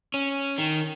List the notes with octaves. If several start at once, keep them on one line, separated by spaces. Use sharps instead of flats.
C#4
D#3